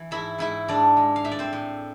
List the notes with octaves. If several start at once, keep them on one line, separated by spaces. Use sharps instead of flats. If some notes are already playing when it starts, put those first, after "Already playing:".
Already playing: E3
G#2 E4 E5
G#2 E4 E5
G#2 D4 D5
G#3
F5
A2 E5
D5
C4 C5
A2